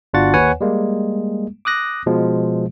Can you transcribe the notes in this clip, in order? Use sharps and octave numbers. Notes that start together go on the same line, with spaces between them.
G1 D4 F4 F#4 F#5 A6
D#2 B4 C#5 F#5 G#5
G3 G#3 A#3
D6 D#6 F#6 A#6
B2 F3 G#3